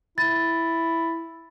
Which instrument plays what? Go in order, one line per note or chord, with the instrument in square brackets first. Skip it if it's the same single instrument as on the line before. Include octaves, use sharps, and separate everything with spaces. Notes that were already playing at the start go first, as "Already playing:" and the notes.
[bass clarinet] E4 [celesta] A6